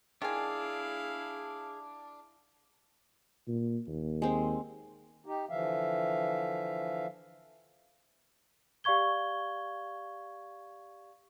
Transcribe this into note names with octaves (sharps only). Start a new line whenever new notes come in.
D#3 D4 E4 G#4 F5 G#5
A#2
D#2
G#3 C4
D#4 G4
D3 E3 F3 E5 F5
G4 D5 F5 C#6 G#6 G7